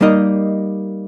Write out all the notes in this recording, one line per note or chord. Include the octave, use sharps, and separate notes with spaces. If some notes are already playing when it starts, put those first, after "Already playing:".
G3 A#3 D#4 A#4 D#5